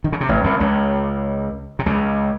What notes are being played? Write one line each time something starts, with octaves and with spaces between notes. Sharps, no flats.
D#3
C#3
C3
A1 A2
C2 C3
C#2 C#3
C3
C#2 C#3